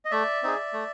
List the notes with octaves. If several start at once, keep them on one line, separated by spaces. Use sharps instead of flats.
D#5
A3 D5 E5
C4 D#4 G#4
A3